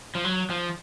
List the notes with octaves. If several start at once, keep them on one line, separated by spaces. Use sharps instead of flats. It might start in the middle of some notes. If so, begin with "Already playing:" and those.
F3
F#3
F3